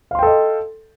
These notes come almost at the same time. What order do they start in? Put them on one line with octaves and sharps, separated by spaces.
F5 C6 G5 A4 D#5